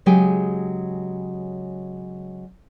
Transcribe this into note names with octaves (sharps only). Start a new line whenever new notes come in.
C#3 F#3 G#3 G4 G5 G#5